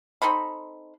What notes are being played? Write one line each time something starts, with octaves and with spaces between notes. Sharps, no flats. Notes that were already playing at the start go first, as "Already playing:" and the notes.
C4 D#4 A4 B5